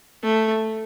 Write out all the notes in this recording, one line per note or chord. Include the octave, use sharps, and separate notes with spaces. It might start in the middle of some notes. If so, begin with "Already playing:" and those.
A3